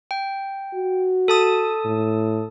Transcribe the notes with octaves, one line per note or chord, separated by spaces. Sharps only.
G5
F#4
A4 A5 D#6
A2